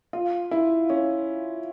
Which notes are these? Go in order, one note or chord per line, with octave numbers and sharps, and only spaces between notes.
F4
E4
C#4